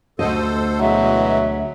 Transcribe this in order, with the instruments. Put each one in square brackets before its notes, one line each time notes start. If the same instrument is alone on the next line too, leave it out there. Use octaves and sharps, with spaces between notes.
[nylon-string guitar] D2 C3 D#5 [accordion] A4 C5
[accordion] B2 E3 G#3 [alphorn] F#3 [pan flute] E5